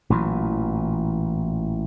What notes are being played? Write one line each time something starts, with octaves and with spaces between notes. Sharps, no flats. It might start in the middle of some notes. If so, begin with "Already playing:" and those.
A1 A#2 E3 F#3